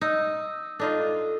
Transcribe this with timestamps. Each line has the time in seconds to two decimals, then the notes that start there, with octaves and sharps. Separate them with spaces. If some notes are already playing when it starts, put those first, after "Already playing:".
0.01 D#4 E6
0.80 D4 D#4 F4 A4